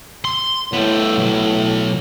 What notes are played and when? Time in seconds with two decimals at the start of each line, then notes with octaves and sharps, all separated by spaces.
0.25 C6
0.73 A2 B3 A4
1.19 B2 F#3